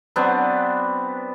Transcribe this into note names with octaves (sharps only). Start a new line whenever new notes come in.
F#3 B3 C4 D4